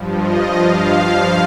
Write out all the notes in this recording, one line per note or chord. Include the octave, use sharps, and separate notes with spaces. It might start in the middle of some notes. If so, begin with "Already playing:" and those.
Already playing: G2 F3
D#5
G2 F3 F5